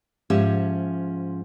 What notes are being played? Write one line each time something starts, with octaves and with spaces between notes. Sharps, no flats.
G#2 F3 C#4 G4 E5